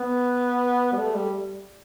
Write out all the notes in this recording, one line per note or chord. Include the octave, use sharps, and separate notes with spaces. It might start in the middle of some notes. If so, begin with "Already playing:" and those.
Already playing: B3
G3
A3
G3